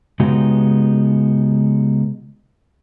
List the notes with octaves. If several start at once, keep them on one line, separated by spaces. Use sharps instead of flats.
C#3 G#3 B3 D#4 F#4 G4